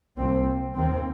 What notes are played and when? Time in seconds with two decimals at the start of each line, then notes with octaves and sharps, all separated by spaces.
0.17 C2 A#2 F3 C4
0.75 D#2 D#3 C4